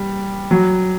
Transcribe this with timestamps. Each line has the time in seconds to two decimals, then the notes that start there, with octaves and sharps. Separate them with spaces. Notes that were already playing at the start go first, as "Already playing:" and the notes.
Already playing: G3
0.51 F#3